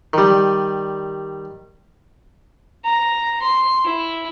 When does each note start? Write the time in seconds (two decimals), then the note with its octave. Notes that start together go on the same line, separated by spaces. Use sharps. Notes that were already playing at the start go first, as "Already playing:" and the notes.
0.13 D#3 G3
2.85 A#5
3.44 C6
3.85 E4